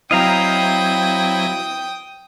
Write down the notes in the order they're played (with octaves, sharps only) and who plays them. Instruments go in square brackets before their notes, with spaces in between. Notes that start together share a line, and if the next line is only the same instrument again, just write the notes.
[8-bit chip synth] F#3 C4 E4 [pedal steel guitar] D#5 F5 A#5 [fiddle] G5 D#6